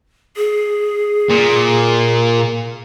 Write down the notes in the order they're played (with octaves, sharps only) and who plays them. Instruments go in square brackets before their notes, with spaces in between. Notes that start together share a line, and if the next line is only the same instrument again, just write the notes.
[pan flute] G#4
[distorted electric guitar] A#2